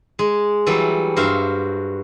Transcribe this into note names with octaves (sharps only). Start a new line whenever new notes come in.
G#3
E3 F#3 G3 A4
G2 F#4 C5 E5 F5